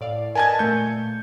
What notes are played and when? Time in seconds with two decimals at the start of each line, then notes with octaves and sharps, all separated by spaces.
0.01 A2 D5 F5
0.35 A#4 B4 D#5 G#5 A5 G#6
0.59 A#2 A3 G6 C#7